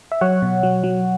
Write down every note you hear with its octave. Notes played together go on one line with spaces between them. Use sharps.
E5
F#3 C#5 F#5
B2
F#3
F#3